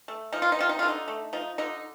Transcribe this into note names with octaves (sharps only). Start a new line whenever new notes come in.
A3
F3 D#4
F4
D#4
C3 F4
D#4
F4
D3
D#4
A3
F3 D#4
D3 D#4